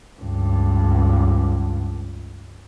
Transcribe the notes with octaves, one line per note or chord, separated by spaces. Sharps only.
C#2 G2